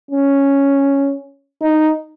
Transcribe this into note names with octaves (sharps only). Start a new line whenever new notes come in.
C#4
D#4